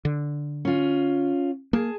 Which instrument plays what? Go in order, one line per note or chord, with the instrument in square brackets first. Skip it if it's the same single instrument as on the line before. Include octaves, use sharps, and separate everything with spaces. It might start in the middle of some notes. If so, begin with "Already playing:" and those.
[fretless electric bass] D3
[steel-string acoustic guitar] C#4 F4
[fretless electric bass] A#3 [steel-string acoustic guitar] G#4 A5